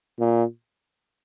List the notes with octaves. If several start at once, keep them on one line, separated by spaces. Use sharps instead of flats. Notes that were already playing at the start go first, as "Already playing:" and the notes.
A#2